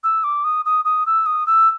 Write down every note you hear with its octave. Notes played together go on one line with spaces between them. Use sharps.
E6
D6
D#6
D#6
D#6
E6
D#6
E6